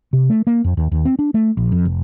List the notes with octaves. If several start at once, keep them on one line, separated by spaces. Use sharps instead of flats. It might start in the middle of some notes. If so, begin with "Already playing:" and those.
C3
A3
A#3
F2
D#2
D#2
C4
D4
A3
A#1
F2
F1